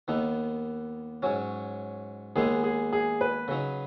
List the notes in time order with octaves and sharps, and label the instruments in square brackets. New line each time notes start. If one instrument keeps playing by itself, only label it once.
[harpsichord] D#2 D#3 B3 D#4
G#2 F#3 C#4
[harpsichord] D#2 D#3 G#3 B3 D#4 [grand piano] G#4
[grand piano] G#4
G#4
B4
[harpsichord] C#3 F#3 D#4